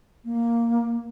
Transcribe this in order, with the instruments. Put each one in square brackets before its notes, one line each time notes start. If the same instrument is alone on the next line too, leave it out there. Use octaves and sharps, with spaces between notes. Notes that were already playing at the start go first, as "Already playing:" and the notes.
[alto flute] A#3